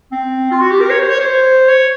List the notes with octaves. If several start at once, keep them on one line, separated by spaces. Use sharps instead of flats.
C4
F4
F#4
G4
A#4
C#5
C5
C#5
C5
C#5